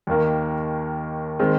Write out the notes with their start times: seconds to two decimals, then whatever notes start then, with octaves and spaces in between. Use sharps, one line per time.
0.07 D#2 D#3 A#3
1.39 D#3 G#3 C4